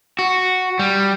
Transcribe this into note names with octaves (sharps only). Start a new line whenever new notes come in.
F#4
G3